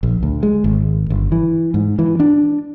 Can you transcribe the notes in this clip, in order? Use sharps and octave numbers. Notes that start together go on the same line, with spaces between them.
A#1
D2
G#3
G#1
G1
E3
G#2
E3
D4